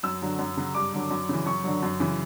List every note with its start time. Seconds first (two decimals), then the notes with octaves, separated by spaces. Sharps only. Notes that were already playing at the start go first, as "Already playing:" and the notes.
0.03 F#2 E6
0.22 D3 F#3
0.39 F#2
0.57 C#3 F#3
0.75 G2 D6
0.93 D3 F#3
1.11 F#2
1.29 C#3 E3
1.46 F#2 C#6
1.64 D3 F#3
1.83 F#2
2.00 C#3 E3